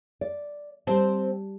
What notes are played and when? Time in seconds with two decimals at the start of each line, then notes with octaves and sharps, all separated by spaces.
0.21 D5
0.87 G3 C4 C5 A5